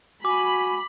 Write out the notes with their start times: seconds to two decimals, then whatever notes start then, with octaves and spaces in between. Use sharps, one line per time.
0.25 F#4 G#5 B5 D6